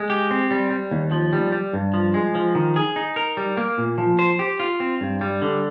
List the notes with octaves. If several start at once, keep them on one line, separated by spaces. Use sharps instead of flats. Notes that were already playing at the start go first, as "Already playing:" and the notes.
Already playing: G#3
G4
C4
G3
G3
D#2
F3
G3
G3
G2
F3
G#3
F3
D#3
G#4
D#4
A#4
G3
A#3
A#2
F3
C5
G4
F4
C4
G2
G3
D3